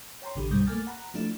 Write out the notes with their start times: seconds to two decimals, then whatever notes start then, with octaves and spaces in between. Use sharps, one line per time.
0.22 C#5 G5 A#5 C6
0.35 A1 D3 G4 B5
0.51 C2 G2 B2 G3 D#6 G6
0.67 A3 A#3 G#5 D6 F6 A6
0.87 F#5 A#5 B5
1.14 F3 A3 D4 E4